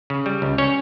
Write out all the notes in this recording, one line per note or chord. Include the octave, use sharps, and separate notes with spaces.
C#3
G3
C#2
C#4 C#5